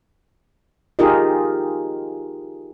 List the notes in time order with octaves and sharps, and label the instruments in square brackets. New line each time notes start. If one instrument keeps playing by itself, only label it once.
[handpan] D#4 F4 G4 G#4 A#4 D#5